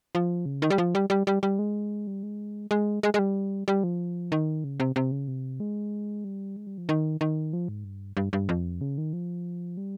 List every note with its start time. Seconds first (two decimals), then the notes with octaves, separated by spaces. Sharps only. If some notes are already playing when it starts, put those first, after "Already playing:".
0.15 F3
0.46 C#3
0.62 D#3
0.70 G3
0.78 F3
0.95 G3
1.10 G3
1.27 G3
1.43 G3
1.59 G#3
2.07 G3
2.23 G#3
2.71 G#3
3.03 G#3
3.14 G#3
3.19 G3
3.68 G3
3.84 F3
4.32 D#3
4.64 C#3
4.80 C3
4.96 C3
5.12 C#3
5.28 C3
5.60 G#3
6.24 G3
6.56 G#3
6.67 G3
6.78 F3
6.89 D#3
7.21 D#3
7.53 F3
7.68 G#2
7.84 G2
8.17 G2
8.33 G2
8.49 F2
8.81 C#3
8.98 D#3
9.13 F3
9.77 G3